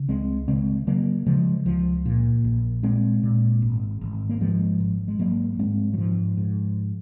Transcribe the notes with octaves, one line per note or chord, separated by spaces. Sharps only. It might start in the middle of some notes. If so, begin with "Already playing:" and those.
Already playing: C#3
C#2 G#3 C4
C#3 G#3 C4
C#3 F#3 A#3
C#3 F3 G#3
C#2 F3
A#2
A#1
A#2 G#3 C4
A#2
G#1
G#1
A#3
G#2 F3 G#3
G#1
G#3
G#1 F#3 A#3
G#2 G#3 C4
F#3
G#2 F3
G#2